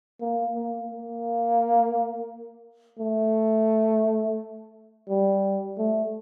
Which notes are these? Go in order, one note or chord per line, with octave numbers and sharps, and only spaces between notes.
A#3
A#3
A#3
A3
G3
A3